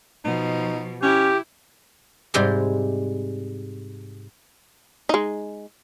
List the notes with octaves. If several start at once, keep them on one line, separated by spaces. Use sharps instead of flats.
B2 F3 D#4
C#4 E4 G4
G#2 C3 G3 G#3 G#4
G#3 D#4